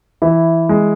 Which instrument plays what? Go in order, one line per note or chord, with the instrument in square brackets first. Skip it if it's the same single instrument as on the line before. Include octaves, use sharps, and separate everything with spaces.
[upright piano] E3 [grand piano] E4
[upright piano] G#3